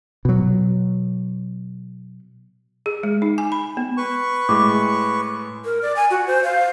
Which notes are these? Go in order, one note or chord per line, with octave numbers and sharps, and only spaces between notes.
B2 F#3
G#4
G#3
D#4
G#5
B5
B3
B4 C#6
A2 G#3 D6
A#4
D5
G#5
F#4
C5
F5